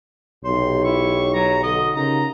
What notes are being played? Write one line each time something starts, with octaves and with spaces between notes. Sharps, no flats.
B1 C3 G4 C#5 C6
E4 C#6
F#3 A#5
D3 F#4 D#5
C#3 D#4 F4 G4 A#4 A#5